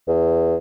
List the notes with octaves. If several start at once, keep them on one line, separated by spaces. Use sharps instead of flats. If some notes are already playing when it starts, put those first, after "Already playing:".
E2